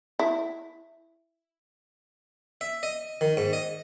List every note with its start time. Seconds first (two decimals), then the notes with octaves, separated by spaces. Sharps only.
0.19 E4
2.61 E5
2.83 D#5
3.21 D#3
3.37 G#2
3.53 D#5